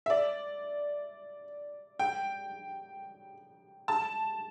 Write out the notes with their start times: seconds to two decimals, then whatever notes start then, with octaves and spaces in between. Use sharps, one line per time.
0.06 E5
0.10 D5
1.99 G5
3.88 A5